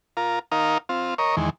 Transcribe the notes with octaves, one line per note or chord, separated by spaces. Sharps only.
F4 A#4
D#4 A#4 F5
C4 F4
A#4 C#5 D#5
E2 D#3 G#3